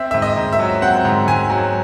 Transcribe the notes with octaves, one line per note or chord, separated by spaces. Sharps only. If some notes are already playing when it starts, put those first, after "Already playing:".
Already playing: C4 E5
G#2 E5
D#5
G#2
E5
F#3
C4 F#5
G#2
G#2 G#5
F#3